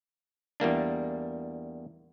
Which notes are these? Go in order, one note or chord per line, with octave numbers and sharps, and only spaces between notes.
E2 G3 A#3 D4